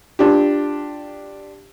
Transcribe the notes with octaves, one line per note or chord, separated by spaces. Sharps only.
D4 F4 G4